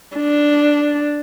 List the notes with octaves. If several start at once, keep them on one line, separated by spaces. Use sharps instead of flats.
D4